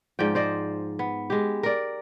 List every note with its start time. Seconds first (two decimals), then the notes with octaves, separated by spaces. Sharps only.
0.19 G#2 F3 D5 G5
0.35 C5 D5 D#5
0.99 B3
1.30 G#3 G4
1.63 A#4 D5